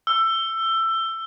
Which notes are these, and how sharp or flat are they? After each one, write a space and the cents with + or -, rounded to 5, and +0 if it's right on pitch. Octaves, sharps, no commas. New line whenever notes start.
E6 +20